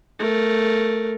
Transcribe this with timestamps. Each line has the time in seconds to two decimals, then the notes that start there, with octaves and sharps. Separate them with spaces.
0.19 A3 A#4